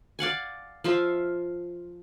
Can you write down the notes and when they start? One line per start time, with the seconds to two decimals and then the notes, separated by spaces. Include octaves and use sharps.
0.19 D5 F5 F#5 G#5
0.84 F3 F4 E5